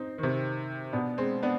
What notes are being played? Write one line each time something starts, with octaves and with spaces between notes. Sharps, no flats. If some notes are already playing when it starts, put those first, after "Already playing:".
Already playing: C4 D#4
D#3
C3
B2 B3 D4
G#3 C4
B3 D4